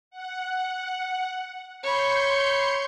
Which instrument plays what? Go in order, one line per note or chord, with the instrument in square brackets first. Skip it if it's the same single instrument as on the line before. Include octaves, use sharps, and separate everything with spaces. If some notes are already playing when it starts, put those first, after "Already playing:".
[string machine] F#5
[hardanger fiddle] C#5 B5 [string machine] C6 G6 C#7